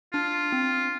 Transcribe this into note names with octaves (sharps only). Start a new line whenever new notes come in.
D4 F4
C4